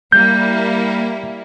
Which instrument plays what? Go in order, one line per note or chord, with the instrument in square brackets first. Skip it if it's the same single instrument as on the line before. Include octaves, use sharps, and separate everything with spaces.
[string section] G3 A#3 E4 [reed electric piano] G6